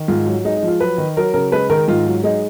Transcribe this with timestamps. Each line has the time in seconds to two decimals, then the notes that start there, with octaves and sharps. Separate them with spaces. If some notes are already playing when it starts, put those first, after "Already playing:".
Already playing: D#3
0.08 G#2 F4
0.26 F#3
0.45 G#3 D#4
0.57 D#4
0.63 F3
0.68 F4
0.80 F#3 B4
0.98 D#3
1.17 F#3 A#4
1.34 C#3 A#4
1.52 G#3 B4
1.70 D#3 A#4
1.88 G#2 F4
2.06 F#3
2.23 G#3 D#4